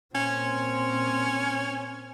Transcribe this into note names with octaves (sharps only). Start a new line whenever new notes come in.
A#2 C4 C#4